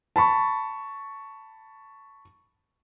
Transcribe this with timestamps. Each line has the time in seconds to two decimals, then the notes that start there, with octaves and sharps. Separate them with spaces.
0.16 A5 B5 C#6